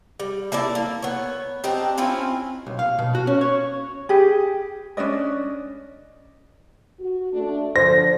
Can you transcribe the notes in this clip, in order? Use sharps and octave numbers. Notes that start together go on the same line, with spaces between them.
G3
A#3 E4 A4 D5
A#3
B3 C#5
C4 D4 D#4 G4
C4 C#4 E4 F4
B1
F5
B2
F#4
C#4
C#5
G4 G#4
C#4 D4 D5 D#5
F#4
A3 D4
D3 F3 C5 A#6